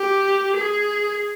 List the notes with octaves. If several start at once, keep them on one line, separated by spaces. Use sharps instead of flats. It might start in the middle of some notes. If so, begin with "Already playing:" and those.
Already playing: G4
G#4